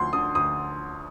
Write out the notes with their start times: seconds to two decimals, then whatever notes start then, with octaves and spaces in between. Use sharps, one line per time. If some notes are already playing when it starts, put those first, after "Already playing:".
Already playing: D2 D3 F3 C6
0.13 D3 D#6
0.35 D2 D#6